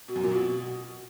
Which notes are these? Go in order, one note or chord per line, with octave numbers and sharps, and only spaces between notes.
B2
F#2
A#2
B2